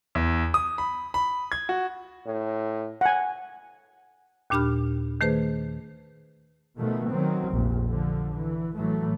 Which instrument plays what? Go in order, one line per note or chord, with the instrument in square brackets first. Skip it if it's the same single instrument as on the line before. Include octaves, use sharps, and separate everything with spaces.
[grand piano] E2
D#6
B5
B5
G#6
F#4
[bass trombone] A2
[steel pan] F#5 G#5
[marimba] D#2 A#2 D4 G4 B5 F6
D#3 A3 G#4 B4 C5
[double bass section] B2 D#3 F3 A3
D#3 F#3 C4
F1 A#1 A#2
D3 F3
E3
A2 E3 F#3 A3